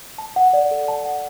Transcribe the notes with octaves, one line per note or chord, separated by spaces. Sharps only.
A5
F#5
D5
A4
A5
F#5